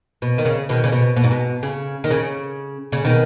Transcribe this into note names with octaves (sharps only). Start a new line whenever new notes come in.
B2
D#3
C#3
B2 D#3
C#3
B2
B2
G#2
B2
C#3
D#3
C#3
C#3
B2 D#3